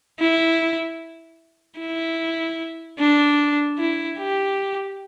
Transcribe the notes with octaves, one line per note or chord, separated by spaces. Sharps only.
E4
E4
D4
E4
G4